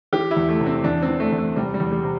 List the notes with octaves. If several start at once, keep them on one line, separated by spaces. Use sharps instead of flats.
E3 G4
E4
E2
A3
C3
C4
E2 D4
C4
E3
A3
E2
A3
C3 G3
G3
E2
G3
C3